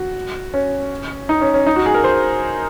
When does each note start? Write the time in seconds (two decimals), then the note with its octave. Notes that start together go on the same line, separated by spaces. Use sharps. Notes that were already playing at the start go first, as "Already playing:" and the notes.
Already playing: F#4
0.54 C#4
1.29 D#4
1.42 C#4
1.54 C#4
1.66 D#4
1.76 F#4
1.86 G#4
1.94 A#4
2.04 C5